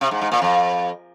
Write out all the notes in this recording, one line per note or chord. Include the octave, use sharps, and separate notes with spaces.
C3
G#2
G#2
A#2
F2